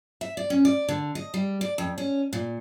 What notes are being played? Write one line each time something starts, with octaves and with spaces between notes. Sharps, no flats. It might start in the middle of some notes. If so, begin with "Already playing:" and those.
E5
D5
C#4
D5
D3
D#5
G3
D5
F2
C#4
A#2